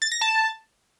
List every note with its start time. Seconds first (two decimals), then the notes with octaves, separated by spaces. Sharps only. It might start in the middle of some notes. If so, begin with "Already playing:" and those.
0.02 A6
0.12 A#6
0.21 A5